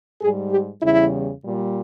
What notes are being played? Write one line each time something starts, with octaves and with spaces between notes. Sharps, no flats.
G#2 G3 G#4
G4
E2 C#3 G3 E4
A#2 G3